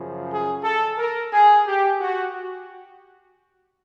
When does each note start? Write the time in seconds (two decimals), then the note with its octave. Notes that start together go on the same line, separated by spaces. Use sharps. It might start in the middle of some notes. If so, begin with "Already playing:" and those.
Already playing: F#2 C#3 F3
0.28 G#4
0.63 A4
0.97 A#4
1.32 G#4
1.66 G4
2.01 F#4